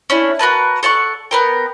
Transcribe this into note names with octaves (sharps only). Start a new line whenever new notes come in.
C#4 D4 E4
F#4 A#4 B4 A5
A4 D5 F#5 C#6
B3 A#4 G5